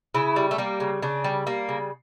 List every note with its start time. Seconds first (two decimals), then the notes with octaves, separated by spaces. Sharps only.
0.15 C#3 E4
0.36 G3
0.51 A3
0.58 G3 A#3
0.80 C#3
1.02 C#3 D4
1.24 G3
1.47 G3 A#3
1.69 C#3